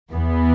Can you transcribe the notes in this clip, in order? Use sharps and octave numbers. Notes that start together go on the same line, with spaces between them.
E2 E3 B3